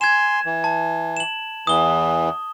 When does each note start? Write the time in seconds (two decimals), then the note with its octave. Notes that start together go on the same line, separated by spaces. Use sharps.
0.01 G#5 C6 G#6 E7
0.45 E3
0.64 A5
1.17 E7 F#7
1.67 E2 E3 D#6 G7